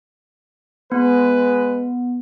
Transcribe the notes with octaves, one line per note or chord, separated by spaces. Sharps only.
G#3 B3 B4